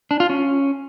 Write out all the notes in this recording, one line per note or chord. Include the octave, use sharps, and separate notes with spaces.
D4
F4
C#4